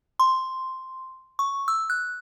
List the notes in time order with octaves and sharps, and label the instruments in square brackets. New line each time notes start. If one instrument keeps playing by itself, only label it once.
[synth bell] C6
C#6
E6
F#6